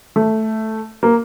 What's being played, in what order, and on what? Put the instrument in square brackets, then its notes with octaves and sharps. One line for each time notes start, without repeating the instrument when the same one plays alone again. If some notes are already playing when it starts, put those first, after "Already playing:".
[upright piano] A3
A#3